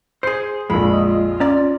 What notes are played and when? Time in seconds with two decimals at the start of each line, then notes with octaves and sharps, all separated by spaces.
0.23 G#4 C5 C7
0.70 A#1 F2 G#3 B5
0.92 D#5
1.07 F4
1.40 C#4 D5 A#5